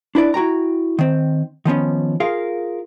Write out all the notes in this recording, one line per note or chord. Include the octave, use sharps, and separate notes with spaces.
D4 E4 B4 D5
E4 F#4 G5 A#5
D#3 C4
D#3 F3 B3 C#4
F4 G#4 A#4 F5